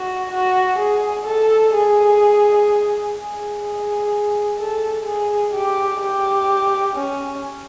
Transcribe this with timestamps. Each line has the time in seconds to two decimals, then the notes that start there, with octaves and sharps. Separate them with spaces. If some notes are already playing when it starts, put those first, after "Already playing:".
Already playing: F#4
0.31 F#4
0.79 G#4
1.26 A4
1.74 G#4
3.15 G#4
3.63 G#4
4.59 A4
5.05 G#4
5.53 G4
6.00 G4
6.95 C#4